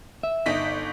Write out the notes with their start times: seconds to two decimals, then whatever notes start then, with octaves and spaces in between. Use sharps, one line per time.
0.23 E5
0.46 G1 D#4 B6